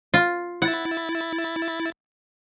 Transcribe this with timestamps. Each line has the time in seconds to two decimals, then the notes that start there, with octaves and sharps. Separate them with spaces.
0.14 F4
0.62 E4 F#5 A6